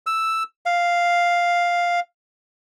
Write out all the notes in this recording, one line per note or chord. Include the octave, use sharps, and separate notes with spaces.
E6
F5